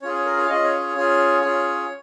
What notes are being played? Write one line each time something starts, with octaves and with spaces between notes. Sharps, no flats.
C#4 F4 G#4 C#5
C#5
A#4
C#5
F5
C#4 F4 G#4 D#5
C#5
C#5
C#4 F4 G#4
C#4 F4 G#4